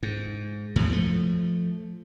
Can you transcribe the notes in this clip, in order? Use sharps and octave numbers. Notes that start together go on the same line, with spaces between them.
G#2
E2 A2 E3 F#3
F3 A3